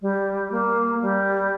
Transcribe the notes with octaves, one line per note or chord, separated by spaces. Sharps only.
G3
A#3
G3